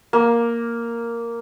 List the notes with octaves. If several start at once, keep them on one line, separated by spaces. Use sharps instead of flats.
A#3